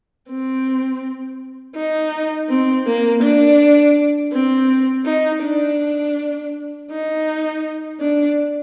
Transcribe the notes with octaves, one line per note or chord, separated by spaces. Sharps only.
C4
D#4
C4
A#3
D4
C4
D#4
D4
D#4
D4